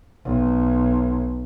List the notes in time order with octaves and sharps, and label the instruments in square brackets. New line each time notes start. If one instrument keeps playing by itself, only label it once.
[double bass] B1